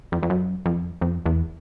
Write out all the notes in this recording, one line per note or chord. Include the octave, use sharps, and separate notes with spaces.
F2
F2
F#2
F2
F2
E2